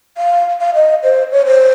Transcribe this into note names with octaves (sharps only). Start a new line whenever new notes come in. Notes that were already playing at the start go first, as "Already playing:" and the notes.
F5
F5
D#5
C5
C#5
C5